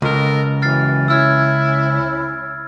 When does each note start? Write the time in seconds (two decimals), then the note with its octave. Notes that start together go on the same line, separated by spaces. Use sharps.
0.02 C#2 A4 A#4 D#5
0.62 F#2 E3 F6 A6 C7
1.08 C#4 E4 E6 F6 G#6